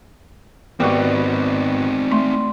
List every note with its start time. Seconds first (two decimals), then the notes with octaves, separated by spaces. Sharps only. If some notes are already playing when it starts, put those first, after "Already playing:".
0.80 G#1 G3 B3 C4 D#4 F#4
2.11 A3 C6